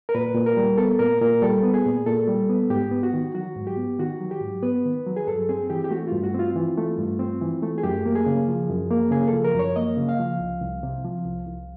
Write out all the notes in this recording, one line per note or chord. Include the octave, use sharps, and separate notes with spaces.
A#4
A#2 B4
A#2
A#4
G3
B3 A4
A#2 A#4
A#2 A#4
G3 A4
B3
G#4
A#2
A#2 A4
G3
B3
G#2 G4
B3
F#4
D#3
F#3 F#4
G#2
G4
B3
D#3 F#4
F#3
G4
G#2
B3 B4
D#3
F#3
G#4
G2 A4
C4 G#4
E3 G4
G4
A3 F#4
F4
G2
F#4
C4 F4
E3
A3
G2
C4
E3
A3
G#4
F#2 G4
A#3
G#4
C#3
F3
F#2
A#3
C#3 G#4
A4
F3
A#4
F#2
C#5
A#3 D#5
C#3
F5
F3
C2
C2
C3
F3
C2
C2